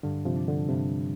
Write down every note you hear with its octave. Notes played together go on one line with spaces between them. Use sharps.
G2 D3
C3 F3
D4
D3
G2 C3